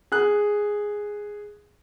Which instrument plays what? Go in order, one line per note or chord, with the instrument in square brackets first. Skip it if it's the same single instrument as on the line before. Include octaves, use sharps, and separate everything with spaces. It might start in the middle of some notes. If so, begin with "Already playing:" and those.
[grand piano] G#4 F#6